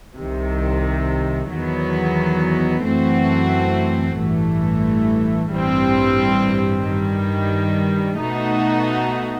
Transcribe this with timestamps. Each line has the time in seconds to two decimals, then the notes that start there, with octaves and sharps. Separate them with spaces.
0.18 C2 C3 D#3
1.51 E2 D#3 F#3 B3
2.85 F#2 E3 A3 C4 F#4
4.19 A1 G2 E3 A3
5.53 A1 G2 E3 G3 C4
6.86 G2 D#3 G3
8.20 B2 A3 D#4 F#4